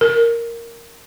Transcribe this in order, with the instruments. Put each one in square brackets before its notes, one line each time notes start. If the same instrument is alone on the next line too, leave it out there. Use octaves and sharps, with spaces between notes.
[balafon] A#4